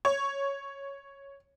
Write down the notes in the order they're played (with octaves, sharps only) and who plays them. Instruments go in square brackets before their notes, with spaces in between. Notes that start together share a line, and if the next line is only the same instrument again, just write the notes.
[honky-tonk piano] C#5